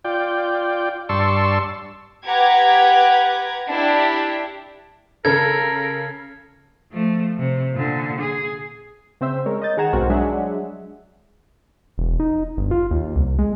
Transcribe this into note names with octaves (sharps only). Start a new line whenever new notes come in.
F4 D5 G5
G2 D5 A5 C6 C#6 E6
G4 B4 F#5 A#5 D6 G#6
D4 E4 G4
C#3 A4 A#4 G#6
F3 A3
C3
A#2 D3
G#4
C#3 C4 C5 E5 E6
G#3 A#4 C#5
D#5 D#6 G6 A6
D#3 G#4 F#5 A#5 G#6 E7
B1 G#2 C4 F#4 A#4
F#3 G#3 D4 G#4 E5 F#5
E1
D#4
G1
F4
D#2
C2
G#3